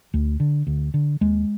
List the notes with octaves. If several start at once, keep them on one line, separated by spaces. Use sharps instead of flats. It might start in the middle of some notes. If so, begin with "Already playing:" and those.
D2
D3
D2
D3
D#2 G#3